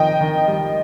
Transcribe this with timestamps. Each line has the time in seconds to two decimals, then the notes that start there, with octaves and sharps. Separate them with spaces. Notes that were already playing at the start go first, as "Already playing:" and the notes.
Already playing: D#3 F3 D#5 G5
0.21 D#3
0.48 G3